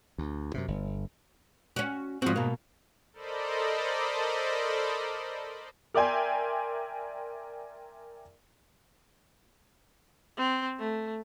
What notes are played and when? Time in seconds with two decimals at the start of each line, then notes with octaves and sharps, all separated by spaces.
0.18 D2
0.54 F#2 A2 C3
0.68 G1
1.76 C#4 F#4
2.22 G#2 F3 C4 F#4
2.36 B2 A#3
3.13 A4 A#4 C5 D5 D#5 B5
5.94 A#4 D5 E5 G5 G#5 C6
10.37 C4
10.79 A3